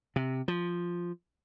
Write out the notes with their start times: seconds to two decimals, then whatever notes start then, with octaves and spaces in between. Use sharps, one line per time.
0.16 C3
0.48 F3